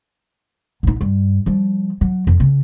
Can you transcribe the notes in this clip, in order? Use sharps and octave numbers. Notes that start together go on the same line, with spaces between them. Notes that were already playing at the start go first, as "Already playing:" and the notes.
A#1 D#4
G2
F3 G3
F#3
F2
C#3